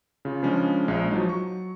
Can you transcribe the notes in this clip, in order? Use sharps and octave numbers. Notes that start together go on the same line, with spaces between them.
C#3 F4
C#3 F3 G#3 C#4 D4
A#1 G#3
F3 F#3 D#4
F#3 C#6